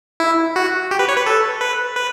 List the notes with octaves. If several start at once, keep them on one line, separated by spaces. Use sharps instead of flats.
E4
F#4
G4
B4
C#5
B4
A4
B4
B4